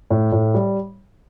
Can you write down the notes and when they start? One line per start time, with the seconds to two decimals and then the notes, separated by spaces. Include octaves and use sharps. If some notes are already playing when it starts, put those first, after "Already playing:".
0.10 A2
0.32 A2
0.54 G3